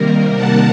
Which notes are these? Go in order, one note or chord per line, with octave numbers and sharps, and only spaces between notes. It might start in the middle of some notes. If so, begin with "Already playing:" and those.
Already playing: C3 D#3 G3 A#3 A#4
F#5 A5